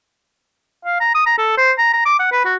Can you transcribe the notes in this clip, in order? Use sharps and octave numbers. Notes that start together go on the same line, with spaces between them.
F5
A#5
D#6
A#5
A4
C5
A#5
A#5
D6
F#5
B4
F#4